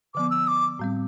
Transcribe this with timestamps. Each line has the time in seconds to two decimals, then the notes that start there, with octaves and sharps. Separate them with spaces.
0.15 D3 F3 B3 D6
0.30 E6
0.47 D6
0.79 A2 G3 C4